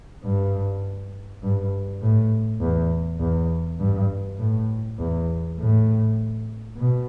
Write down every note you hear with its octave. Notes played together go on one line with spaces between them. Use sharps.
G2
G2
A2
E2
E2
G2
A2
E2
A2
B2